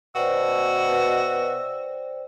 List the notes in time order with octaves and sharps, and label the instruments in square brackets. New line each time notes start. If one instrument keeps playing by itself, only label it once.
[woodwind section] B2 [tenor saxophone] F#4 [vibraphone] C5 D5 G5 [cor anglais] E5